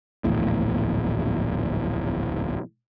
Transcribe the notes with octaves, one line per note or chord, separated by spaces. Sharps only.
D1 A#1 E2 A2